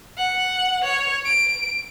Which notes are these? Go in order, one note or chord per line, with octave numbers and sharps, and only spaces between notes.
F#5
C#5
D7